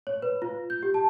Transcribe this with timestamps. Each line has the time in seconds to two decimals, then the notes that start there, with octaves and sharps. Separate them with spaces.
0.07 C#5
0.22 B4
0.42 F4
0.70 G6
0.83 G4
0.94 A5